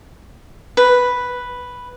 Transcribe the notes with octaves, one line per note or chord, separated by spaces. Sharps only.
B4